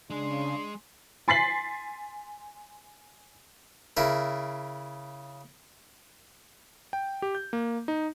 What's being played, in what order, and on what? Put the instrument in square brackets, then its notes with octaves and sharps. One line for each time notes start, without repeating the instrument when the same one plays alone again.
[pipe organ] C#3 [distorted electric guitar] G#3 G#4 [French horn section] D4 [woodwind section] C6
[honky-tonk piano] G#5 C6 A6 B6 C7 F#7
[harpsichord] C#3 E4 A#4
[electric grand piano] G5
G4
G6
A#3
D#4